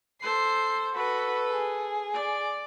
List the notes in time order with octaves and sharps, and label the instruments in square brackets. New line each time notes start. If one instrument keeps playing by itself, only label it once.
[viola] A4 C5 [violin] C7
[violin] F#4 B5 [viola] A4 B4
[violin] G#4
[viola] D5